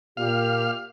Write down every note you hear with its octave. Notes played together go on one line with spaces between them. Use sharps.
A#2 G4 F5